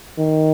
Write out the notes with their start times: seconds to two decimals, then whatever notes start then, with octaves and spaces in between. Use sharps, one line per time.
0.18 D#3